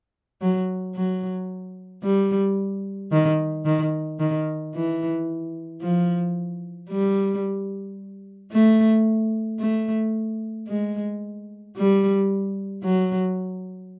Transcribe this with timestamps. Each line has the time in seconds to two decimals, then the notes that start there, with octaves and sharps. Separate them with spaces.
0.41 F#3
0.95 F#3
2.03 G3
3.12 D#3
3.65 D#3
4.19 D#3
4.74 E3
5.81 F3
6.90 G3
8.52 A3
9.59 A3
10.68 G#3
11.76 G3
12.84 F#3